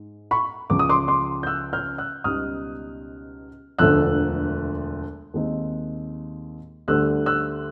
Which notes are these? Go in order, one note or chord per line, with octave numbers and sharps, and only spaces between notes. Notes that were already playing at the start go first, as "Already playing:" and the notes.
Already playing: G#2
B5 C#6
C#2 C#3 F3 D6
D#6
C6 D6
C6 D6
G6
E6 F#6
F6 G6
E6 F#6
C#2 B2 G3 B3 D#4 D#6 F6
E1 D2 D3 F3 A3 E6 F#6
D#2 D#3 G#3 C4 D#4
D2 D3 G3 E6 F#6
E6 F#6